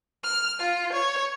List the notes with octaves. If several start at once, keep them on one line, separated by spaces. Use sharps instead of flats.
F6
F4
C#5